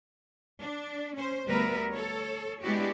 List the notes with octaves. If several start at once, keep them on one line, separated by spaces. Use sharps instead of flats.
D4
C#4 C5
D2 G3 B3 A#4 B4 E5
A4 C#5
G#3 B3 D4 E4 F#4 G4